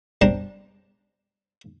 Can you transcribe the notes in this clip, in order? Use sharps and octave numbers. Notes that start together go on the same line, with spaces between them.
G3 D4 C5 A5 A#5